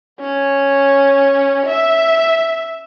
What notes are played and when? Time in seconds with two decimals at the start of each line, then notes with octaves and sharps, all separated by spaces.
0.20 C#4
1.67 E5